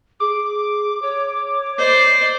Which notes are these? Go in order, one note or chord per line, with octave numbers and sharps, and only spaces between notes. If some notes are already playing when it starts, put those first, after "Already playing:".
G#4 D6
C#5
C5 D5 D#5